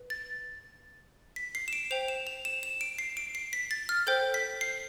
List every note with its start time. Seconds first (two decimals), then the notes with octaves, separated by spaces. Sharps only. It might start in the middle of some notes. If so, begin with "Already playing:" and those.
Already playing: B4
0.10 A6
1.36 B6
1.55 C7
1.68 E7
1.73 D7
1.91 C5 G5 F7
2.08 E7
2.27 F7
2.45 E7
2.63 E7
2.81 D7
2.99 C7
3.17 D7
3.35 C7
3.53 B6
3.71 A6
3.89 F6
4.07 A4 C5 G5 G6
4.34 B6
4.61 C7